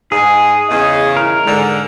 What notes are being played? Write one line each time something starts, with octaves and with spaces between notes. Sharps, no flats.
G#2 D#4 G#4
E2 C#3 D#5
E4 A#4
G#2 D3 G#3